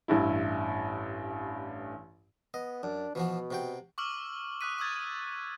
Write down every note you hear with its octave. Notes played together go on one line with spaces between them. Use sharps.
A1 G2 E4
B3 D#5
F#2 D4
B2 E3 F3 F#4
C3 F#4 G5
C#6 D6 E6 F6 F#7
C#6 D#6 F#6 B6 D#7
C#6 D#6 E6 G#6 A6